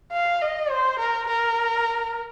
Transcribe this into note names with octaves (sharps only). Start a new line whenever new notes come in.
F5
D#5
C5
A#4
A#4